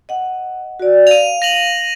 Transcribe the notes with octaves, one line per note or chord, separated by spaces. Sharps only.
D#5 F#5
F#4 D5
F5 D#7 F7
A#6 F7 F#7